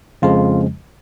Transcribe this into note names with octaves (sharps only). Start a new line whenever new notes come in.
F2 C#3 F3 G#3 F4